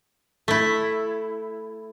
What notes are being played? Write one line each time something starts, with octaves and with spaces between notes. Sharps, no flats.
A3 E4